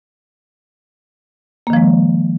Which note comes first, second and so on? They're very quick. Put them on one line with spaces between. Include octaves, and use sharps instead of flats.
A#3 D#3 F3 G#3